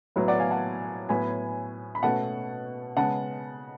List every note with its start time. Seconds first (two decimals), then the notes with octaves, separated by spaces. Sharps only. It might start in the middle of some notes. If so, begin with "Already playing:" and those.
0.16 A2 F#3 B3
0.28 D5 F#5
0.39 F5 G#5
0.50 F#5 A5
1.09 A2 F#3 B3 G#5 B5
1.95 B5
2.03 B2 A3 C#4 F#5 A5
2.97 C#3 G#3 B3 F#5 A5